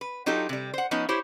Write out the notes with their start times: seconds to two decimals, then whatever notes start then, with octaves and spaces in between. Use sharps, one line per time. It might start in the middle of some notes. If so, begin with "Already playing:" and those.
0.01 B4
0.26 F#3 D#4 F4 G4 A4
0.49 C3 G3
0.74 C5 F#5
0.91 F3 B3 C#4 D#4
1.09 E4 G4 C5 C#5